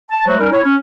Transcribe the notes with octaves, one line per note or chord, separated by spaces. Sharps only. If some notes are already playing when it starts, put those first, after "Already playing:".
A5
F#3 G#3 A3 F#4 C5
G3 C#4 D#4 A#4
E4 C#5
C#4